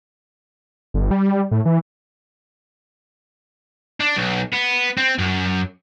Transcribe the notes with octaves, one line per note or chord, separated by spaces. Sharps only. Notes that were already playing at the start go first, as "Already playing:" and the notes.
G1
G3
A2
E3
D4
B1
B3
C4
F#2